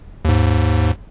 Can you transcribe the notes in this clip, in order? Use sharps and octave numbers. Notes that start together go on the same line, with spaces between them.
D#2 G#2